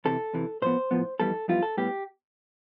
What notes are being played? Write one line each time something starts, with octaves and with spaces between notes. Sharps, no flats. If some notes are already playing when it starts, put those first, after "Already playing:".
E2 C3 E3 A4
E2 C3 E3
A2 F3 B3 C5
A2 F3 B3
F2 E3 G3 B3 A4
F2 E3 G3 B3 F4
A4
A2 G3 B3 G4